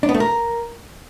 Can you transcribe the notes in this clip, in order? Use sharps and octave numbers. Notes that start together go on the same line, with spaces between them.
D4
B3
A3
A#4